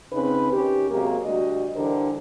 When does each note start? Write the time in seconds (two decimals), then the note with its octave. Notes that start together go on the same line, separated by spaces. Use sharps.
0.13 C#3 C4 D#4 B4
0.51 D#3 C#4 G4
0.90 C3 F#3 G#3 A#3
1.24 D2 G3 F#4 D#5
1.76 D3 E3 G3 A#4 C5